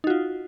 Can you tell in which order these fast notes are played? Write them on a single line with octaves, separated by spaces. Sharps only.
D#4 F#4 F4